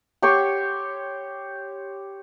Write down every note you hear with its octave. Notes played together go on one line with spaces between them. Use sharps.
G4 C#5 C6 C#6